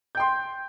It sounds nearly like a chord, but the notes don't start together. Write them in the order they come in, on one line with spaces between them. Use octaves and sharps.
G6 G5 C6